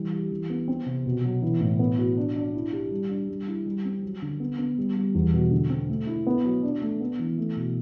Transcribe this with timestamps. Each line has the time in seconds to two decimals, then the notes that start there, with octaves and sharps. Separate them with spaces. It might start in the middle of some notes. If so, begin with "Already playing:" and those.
Already playing: E3 G3
0.12 G4
0.31 E3
0.50 B3
0.68 C4
0.86 C3
1.06 B2
1.24 F#3
1.42 E3
1.61 A2
1.79 B3
1.99 F#4
2.17 D4
2.36 D4
2.54 E4
2.73 G4
2.91 G3
3.10 D4
3.29 G3
3.47 E4
3.66 G3
3.85 C4
4.03 F#3
4.22 D3
4.40 B3
4.58 B3
4.78 G3
4.96 G3
5.15 E2
5.34 B2
5.51 D3
5.70 C4
5.90 A3
6.07 E4
6.27 B3
6.44 F#3
6.63 D4
6.82 A3
7.00 B3
7.19 E3
7.38 A3
7.56 B2